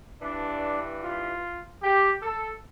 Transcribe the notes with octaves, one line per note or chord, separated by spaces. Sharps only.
G2 E3 D4
F4
G4
A4